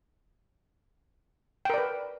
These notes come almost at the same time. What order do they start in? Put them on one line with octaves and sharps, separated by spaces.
G5 A#4 D5 B4